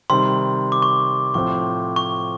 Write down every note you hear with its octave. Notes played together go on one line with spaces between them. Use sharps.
C3 D#3 G3 C6
D6
C#6
A2 F3 A3 C4 C#6
C#6